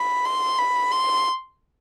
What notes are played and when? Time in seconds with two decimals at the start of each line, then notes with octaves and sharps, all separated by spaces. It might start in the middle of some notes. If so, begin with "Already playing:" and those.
Already playing: B5
0.25 C6
0.59 B5
0.92 C6